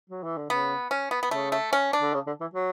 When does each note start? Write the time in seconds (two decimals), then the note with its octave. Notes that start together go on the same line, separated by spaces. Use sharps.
0.10 F#3
0.23 E3
0.37 D3
0.50 C#3 B3
0.91 C#4
1.11 B3
1.23 B3
1.31 C#3 A3
1.52 A3
1.73 C#4
1.93 D4
2.02 D3
2.14 C#3
2.27 D3
2.41 E3
2.54 F#3